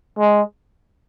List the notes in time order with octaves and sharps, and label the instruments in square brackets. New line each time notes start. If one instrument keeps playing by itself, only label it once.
[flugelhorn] G#3